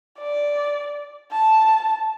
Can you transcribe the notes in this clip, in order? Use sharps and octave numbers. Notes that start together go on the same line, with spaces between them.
D5
A5